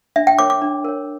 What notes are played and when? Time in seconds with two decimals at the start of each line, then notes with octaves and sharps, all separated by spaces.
0.16 D4 E5
0.27 G5
0.39 A#4 C#5 D6
0.50 D6
0.62 D4
0.85 A#4 C#5